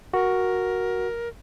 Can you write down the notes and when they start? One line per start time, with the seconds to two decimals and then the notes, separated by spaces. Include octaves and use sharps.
0.14 F#4 A#4